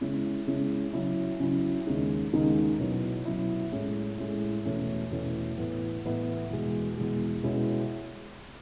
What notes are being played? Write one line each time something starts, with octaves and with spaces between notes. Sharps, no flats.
C#3 G#3 C#4 E4
C#3 G#3 C#4 E4
C#3 F#3 C#4 E4
C#3 F#3 C#4 E4
D#2 C#3 G#3 D#4
D#2 C#3 G#3 D#4
B2 F#3 C#4 E4
B2 F#3 C#4 E4
A2 G#3 C#4 E4
A2 G#3 C#4 E4
E2 B2 A3 C#4 E4
E2 B2 A3 C#4 E4
A2 E3 B3 E4
A2 E3 B3 E4
E2 B2 G#3
E2 B2 G#3
B2 G#3 C#4 E4